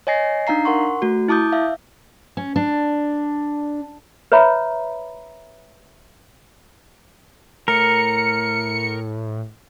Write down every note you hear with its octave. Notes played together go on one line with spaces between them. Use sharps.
C#5 D#5 G#5 A#6 C7
D4 D#4 F5 A#5 C7
A#4 F#5 C6 C#6
A3 F#4
E4 A5 D6 D#6 G6
E5 F5
C#4
D4
B4 C#5 E5 A#5 B5
A2 A#4 C#7